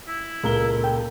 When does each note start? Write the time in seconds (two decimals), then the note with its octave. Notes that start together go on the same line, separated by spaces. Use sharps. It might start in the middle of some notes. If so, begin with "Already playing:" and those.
0.08 E4
0.43 C#2 A#2 A4 A#4 G7
0.84 G5